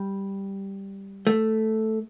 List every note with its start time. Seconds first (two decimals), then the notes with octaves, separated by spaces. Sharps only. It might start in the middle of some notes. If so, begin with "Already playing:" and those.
Already playing: G3
1.27 A3